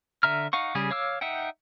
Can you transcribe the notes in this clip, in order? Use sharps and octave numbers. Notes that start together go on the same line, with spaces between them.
D3 E5 A#5 F6
D#4 F5 F#5 C#6
C#3 G3 G#4
C#5 F5 D6 E6
D#4 E5 F#5 G5